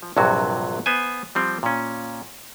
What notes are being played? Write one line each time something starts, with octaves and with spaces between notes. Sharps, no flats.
F3
A#1 G2 C3 F#3 F#4
B3 C5 G#5
F3 G3 C4
A#2 C#4